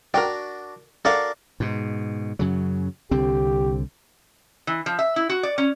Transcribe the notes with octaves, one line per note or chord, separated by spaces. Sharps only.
D4 F#4 A#4 G5
D4 F#4 A4 A#4 D5 F5
G#2 B2
F#2 C#3 F#3
C2 D3 C4 G4
E3
F3
E5
E4
F#4
D5
C#4